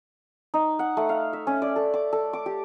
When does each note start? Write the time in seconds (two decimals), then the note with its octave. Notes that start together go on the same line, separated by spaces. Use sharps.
0.54 D#4
0.79 F#5
0.97 A3
1.09 F5
1.33 E5
1.47 C#4
1.62 D5
1.76 A4
1.94 D6
2.13 A4
2.33 D6
2.46 G4